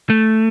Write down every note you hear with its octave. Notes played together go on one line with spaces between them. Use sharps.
A3